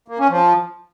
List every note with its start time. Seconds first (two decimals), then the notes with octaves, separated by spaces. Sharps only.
0.08 A#3
0.19 C#4
0.30 F3